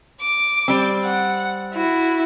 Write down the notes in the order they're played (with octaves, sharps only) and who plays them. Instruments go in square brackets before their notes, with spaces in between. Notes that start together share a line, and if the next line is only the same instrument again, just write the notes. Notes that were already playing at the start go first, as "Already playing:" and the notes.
[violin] D6
[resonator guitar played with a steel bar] G3 C4
[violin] F#5
[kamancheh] E4 [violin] F#4